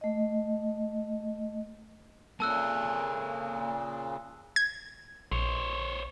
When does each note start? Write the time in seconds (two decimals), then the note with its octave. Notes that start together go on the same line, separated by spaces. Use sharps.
0.01 A3 D#5
2.40 A#2 C#3 A#3 A4 A5 E6 F#6
4.56 G#6
5.32 A#1 C5 C#5